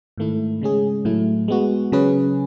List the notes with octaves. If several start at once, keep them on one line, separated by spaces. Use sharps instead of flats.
G#2 D#3 A3 E4
C#3 G#3 C#4 G#4
A2 F#3 A3 E4
G#3 B3 F#4
C#3 F#3 C#4 G#4 B4